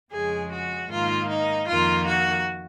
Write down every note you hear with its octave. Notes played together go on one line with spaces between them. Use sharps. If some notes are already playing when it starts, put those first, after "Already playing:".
F2 C#3 G#3 G#4
F#4
G#2 D#3 A#3 F4
D#4
F2 D#3 A#3 F4
F#4